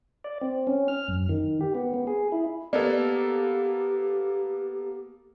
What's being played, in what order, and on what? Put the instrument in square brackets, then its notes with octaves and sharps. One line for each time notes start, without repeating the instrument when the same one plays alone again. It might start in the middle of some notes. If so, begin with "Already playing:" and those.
[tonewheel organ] D5
C4
C#4
F6
F#2
D#3
G4
B3
B3
G#4
E4
[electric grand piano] A#3 B3 A4 [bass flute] G4 [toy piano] D5